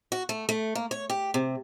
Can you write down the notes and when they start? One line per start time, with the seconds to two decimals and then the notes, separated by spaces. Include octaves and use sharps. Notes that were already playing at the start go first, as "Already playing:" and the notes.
0.12 F#4
0.29 A3
0.49 A3
0.75 A#3
0.91 C#5
1.10 G4
1.34 C3